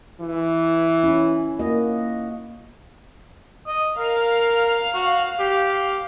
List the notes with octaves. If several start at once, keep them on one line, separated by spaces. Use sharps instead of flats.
E3
C#4 E4
A#3 F#4 D#5
D#5
A#4 F5
F#4
G4